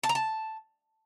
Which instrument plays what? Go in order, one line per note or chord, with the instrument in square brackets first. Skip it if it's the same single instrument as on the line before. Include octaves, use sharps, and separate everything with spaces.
[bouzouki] A5
A#5
A5